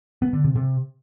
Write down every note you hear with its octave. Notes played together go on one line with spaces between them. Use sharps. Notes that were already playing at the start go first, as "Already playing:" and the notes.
B3
D3
C3
C3